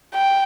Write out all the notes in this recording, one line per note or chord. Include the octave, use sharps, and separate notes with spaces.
G5